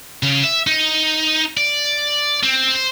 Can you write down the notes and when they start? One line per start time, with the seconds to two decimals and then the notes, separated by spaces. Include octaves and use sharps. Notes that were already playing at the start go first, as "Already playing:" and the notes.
0.23 C#3
0.44 E5
0.67 D#4
1.57 D5
2.43 C4
2.75 C5